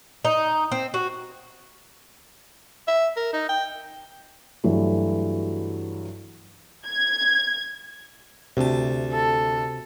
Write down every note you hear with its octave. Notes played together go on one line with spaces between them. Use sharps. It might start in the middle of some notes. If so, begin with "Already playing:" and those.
D#4
C4
F#4
E5
A#4
D#4
G5
G2 E3 F#3 A3
G#6
D2 C3 A5
A4